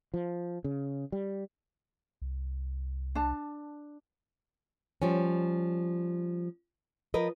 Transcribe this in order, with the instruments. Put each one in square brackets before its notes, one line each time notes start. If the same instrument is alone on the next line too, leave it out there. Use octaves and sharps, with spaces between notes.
[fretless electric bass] F3
C#3
G3
[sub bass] C2
[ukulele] D4 A5
[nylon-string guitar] F3 G3 C#4
F3 A#4 B4 D#5